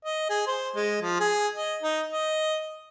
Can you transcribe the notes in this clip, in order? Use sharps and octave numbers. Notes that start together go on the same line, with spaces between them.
D#5
G#4
C5
G#3
F3
G#4
D#5
D#4
D#5